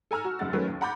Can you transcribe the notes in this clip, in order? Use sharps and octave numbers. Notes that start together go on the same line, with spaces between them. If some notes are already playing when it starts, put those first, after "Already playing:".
A4 G#5 A#5 E6 F6
F#4
F1 F#2 C#3 F#5 A6
D#3 F#3 A3 C#4 A#4 B4
D#2
F#5 A#5 B5 D6 G6 A6